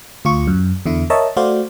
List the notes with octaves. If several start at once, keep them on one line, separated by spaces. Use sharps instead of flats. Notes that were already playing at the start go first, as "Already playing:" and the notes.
D2 F4 C#6
F#2
E2 D3 E4
A#4 C#5 D#5 E5 A5
A3 F#4 C5 D5 F5